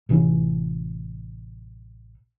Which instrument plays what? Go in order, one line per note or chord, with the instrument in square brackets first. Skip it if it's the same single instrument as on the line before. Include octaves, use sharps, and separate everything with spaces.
[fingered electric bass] A1 C3 E3 C#4